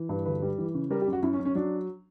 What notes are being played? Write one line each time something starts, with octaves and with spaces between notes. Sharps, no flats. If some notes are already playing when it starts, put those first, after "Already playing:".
Already playing: E3
G2 B4
D2 B4
G3
E3
C#3
G3 A#4
G4
F#2
F#4
F#2 E4
C#4
F#2
C#4
F#3 D4